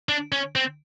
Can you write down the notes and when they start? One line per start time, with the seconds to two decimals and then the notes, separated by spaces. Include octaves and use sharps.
0.09 D4
0.32 C#4
0.55 C4